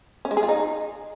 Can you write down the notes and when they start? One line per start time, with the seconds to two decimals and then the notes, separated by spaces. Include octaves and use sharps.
0.25 C#4
0.31 G#3
0.37 G#4
0.43 F4
0.49 D#4